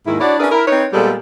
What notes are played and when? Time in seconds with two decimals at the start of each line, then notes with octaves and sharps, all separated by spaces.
0.07 D#2 G#2 D#3 E4
0.20 D4 E4 F#4 C#5 D5
0.40 C#4 D4 E4 G#4 A#4 B4
0.51 E4 A#4
0.68 C4 D#4 B4 C#5
0.93 A#2 G3 G#3 B3 A4